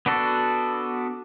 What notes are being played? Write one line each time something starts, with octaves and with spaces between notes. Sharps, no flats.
B3 D4 F#4 A4